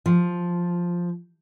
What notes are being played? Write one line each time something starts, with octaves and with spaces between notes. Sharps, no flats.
F3